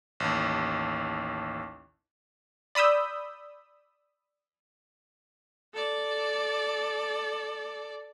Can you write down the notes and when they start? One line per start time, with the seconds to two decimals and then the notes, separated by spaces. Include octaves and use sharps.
0.20 A1 D#2
2.75 D5 B5 D#6 E6 G6
5.74 A4 D5